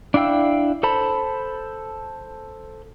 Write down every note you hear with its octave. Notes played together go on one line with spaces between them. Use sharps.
D4 E4 F5 G5 E6
A4 C5 A5 B5